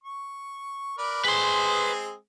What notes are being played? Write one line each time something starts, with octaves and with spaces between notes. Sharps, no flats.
C#6
A#4 B4 D5
G#3 C4 G#4 B4 C6